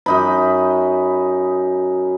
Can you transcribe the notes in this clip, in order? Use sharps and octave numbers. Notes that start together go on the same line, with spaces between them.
F#2 D#4 B5